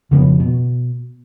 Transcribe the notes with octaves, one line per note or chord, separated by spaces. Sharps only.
F1 C#3 F3 B3
B2